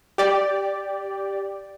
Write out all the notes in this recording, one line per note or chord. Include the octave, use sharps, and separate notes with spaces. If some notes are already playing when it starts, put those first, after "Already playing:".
G4 D5